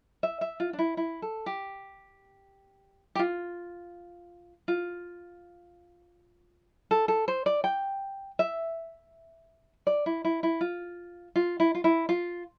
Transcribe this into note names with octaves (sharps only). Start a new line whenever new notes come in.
E5
E5
F4
D4
E4
E4
A4
G4
G4
F4
F4
A4
A4
C5
D5
G5
E5
D5
E4
E4
E4
F4
F4
E4
F4
E4
F4